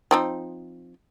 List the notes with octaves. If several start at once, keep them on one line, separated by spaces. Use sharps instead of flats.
F3 C4 D#4